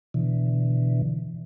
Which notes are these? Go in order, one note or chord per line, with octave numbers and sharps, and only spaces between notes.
B2 D3 E3